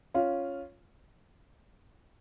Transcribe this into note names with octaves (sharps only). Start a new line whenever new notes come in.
C#4 F4